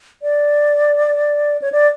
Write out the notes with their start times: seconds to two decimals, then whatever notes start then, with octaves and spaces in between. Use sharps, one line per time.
0.22 D5
1.62 C#5
1.72 D5